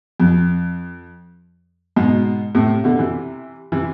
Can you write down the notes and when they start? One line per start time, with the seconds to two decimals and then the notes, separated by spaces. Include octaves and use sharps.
0.20 F2
1.96 G#2 B2
2.55 A2 C3
2.84 B2 D3
2.99 C3 E3
3.72 C3 E3